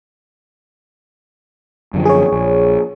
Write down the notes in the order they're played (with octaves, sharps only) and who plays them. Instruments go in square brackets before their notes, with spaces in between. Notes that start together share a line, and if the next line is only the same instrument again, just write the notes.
[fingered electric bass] F#2 D3 F3
[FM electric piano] G#4 C#5
[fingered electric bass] A#1